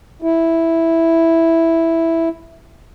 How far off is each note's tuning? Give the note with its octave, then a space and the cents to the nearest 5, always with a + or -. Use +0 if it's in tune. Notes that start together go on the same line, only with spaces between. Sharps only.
E4 +0